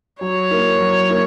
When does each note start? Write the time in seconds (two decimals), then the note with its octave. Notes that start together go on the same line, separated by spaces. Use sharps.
0.21 F#3 C#5
0.51 A#3 E4 A#4
0.80 F#3
1.10 A#3 E4 A#4